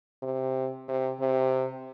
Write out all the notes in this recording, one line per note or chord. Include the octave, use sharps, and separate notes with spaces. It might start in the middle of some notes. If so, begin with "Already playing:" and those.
C3
C3
C3